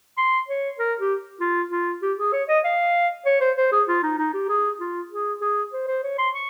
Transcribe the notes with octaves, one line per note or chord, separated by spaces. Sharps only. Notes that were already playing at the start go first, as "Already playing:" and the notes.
C6
C#5
A#4
G4
F4
F4
G4
G#4
C#5
D#5
F5
C#5
C5
C5
G#4
F4
D#4
D#4
G4
G#4
F4
G#4
G#4
C5
C5
C#5
C6
C#6